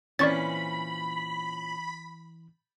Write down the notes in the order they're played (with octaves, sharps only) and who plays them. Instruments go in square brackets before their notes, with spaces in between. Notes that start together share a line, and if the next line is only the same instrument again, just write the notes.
[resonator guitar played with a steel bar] A#2 C4 C#4 [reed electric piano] E3 [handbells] D5 C#6 A6 [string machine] B5